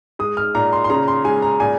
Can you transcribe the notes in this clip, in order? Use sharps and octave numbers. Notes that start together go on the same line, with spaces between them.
G#3 D#6
F6
A#2 A#5
C6
C6
C#3 A#5
C6
G#3 G#5
A#5
A#2 G#5